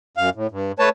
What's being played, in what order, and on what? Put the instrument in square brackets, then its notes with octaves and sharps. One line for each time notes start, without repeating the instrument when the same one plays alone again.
[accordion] F#2 F5
A2
G2
A3 B4 C#5 A5